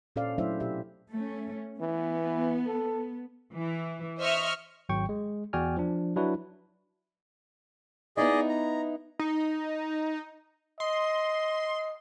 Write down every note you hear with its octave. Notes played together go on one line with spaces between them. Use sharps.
A#2 C#4 A4 C5 D5 F5
F#3 A3 D4 E4 C5 E5
B2 G4 E5
A3 C#4
E3 B3
A4
E3
C5 D#5 E5 C#6 F6
G#1 F#3 G5 C#6
G#3
E2 F#4 D5 G5 G#5 F6
F3 D4
F#3 D4 E4 F#4 B4
B3 D#4 E4 G#4 D5 D#5
A#5
D#4
D#5 C6